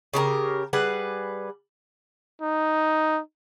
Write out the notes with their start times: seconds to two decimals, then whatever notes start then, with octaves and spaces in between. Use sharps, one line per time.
0.14 C#3 G4 G#4 A#4
0.73 G3 G#4 B4 F#5
2.42 D#4